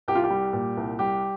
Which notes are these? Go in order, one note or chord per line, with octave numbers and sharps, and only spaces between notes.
C2 G4
F4
G4
G3
A#2
C2
G3 G4